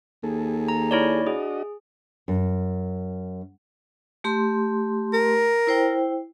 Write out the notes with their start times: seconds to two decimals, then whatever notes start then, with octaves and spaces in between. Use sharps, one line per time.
0.23 D#2 G#4 A4
0.68 A#5
0.91 E4 C#5 D5
1.27 D4 F#4 G#4 D#5
2.28 F#2
4.24 A3 G4 C6
5.14 A#4
5.67 E4 C5 G5